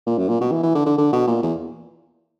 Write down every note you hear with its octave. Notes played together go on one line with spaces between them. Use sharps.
A#2
F#2
A#2
B2
E3
E3
D3
D3
D3
B2
A#2
E2